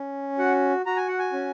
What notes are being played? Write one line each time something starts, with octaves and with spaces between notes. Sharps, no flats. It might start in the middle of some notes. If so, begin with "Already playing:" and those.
Already playing: C#4
F#4 F#5
F#4 A#5
G#5
F#5
G#5
C#4